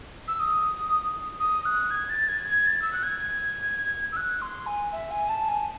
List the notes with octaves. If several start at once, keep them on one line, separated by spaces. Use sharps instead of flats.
E6
D#6
D#6
F#6
G#6
A6
G#6
G#6
A6
E6
F#6
G#6
E6
F#6
C6
G#5
E5
G#5
A5
G#5